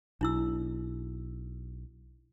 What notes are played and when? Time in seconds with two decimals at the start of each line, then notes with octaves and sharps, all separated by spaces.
0.21 B1 D4 E4 E6